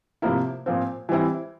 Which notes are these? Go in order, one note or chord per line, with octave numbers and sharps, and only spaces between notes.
C3 F3 A#3 E4
A#2 F3 C4
E3 G3 C4 E4